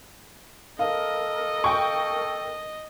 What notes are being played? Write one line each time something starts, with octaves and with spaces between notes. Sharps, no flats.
A4 A#4 D#5 F5
G5 C#6